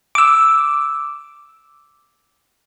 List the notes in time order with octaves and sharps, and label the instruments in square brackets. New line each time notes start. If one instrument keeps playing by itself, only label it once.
[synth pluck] D6 E6